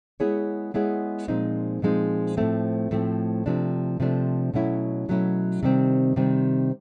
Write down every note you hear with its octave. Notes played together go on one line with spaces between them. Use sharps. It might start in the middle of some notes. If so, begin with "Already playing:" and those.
G#3 B3 E4 G#4 C#5
G#3 B3 E4 G#4 C#5
A#2 F3 G#3 C4 D#4
A#2 F3 G#3 C4 D#4
A2 F3 A3 C4
A2 F3 A3 C4
C3 F3 A3 D4
C3 F3 A3 D4
B2 F#3 A3 C#4 E4
B2 F#3 A3 C#4 E4
C3 D#3 G3 C4
C3 D#3 G3 C4